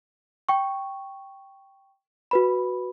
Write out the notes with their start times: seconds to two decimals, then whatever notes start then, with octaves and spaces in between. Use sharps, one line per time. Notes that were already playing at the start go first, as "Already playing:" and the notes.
0.49 G5 C#6
2.31 F#4 B4 B5